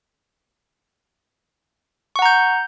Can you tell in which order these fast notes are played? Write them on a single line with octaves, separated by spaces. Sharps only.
C#6 F#5 A#5 G6